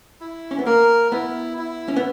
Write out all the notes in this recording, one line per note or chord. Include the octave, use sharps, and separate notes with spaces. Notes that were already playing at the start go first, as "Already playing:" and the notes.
E4
C#4
B3
A#3 A#4
B3 E4
E4
C#4
B3